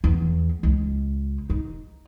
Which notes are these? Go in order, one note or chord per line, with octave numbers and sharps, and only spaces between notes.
E2
C#2
D#4